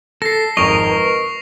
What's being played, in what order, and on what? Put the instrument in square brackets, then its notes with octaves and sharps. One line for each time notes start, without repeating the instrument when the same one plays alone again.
[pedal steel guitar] A4 [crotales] A#6 C7
[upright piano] G#1 F2 [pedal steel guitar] A#4 D#5 [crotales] C#6 A#6 F7
[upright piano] B4